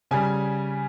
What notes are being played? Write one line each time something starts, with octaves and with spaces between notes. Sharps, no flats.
C#3 G3 G#5